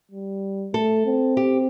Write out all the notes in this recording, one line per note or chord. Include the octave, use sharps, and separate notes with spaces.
G3
A3 A4
C4
G4